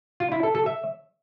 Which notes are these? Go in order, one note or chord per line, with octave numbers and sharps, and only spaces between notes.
F4
E4
A4
A4
E5